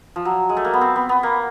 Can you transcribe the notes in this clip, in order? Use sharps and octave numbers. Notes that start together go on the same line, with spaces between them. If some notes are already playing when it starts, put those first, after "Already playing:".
F3
F#3
G#3
A3
A#3
B3
C4
B3
B3
A#3